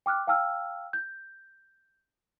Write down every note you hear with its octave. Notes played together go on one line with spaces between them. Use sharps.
G5 D6 F6 F#6
F5 G5 A5 E6 F6
G6